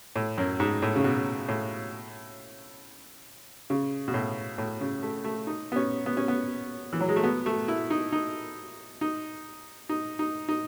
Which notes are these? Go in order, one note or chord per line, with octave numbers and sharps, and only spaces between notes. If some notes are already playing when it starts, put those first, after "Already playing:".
A2
F#2
G#2
A2
C#3
B2
A2
C#3
B2
A2
A2
C#3
A3
A3
D#4
B3
C#4
B3
C#4
B3
E3
F#3
G#3
A3
B3
A3
E4
D#4
D#4
D#4
D#4
D#4
D#4